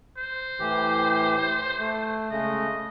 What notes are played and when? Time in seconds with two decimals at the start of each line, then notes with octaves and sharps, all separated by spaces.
0.17 C5
0.60 A2 E3 G4
1.79 A3
2.31 C#3 G#3 A3 D#5